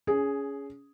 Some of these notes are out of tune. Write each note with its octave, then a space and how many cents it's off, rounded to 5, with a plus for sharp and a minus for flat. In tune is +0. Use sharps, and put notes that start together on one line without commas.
C#4 +20 G#4 +0